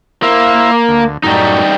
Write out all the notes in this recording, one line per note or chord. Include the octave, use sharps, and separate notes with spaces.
A#3 E4 C5 E5
D2
F#2 A2 G3 D#4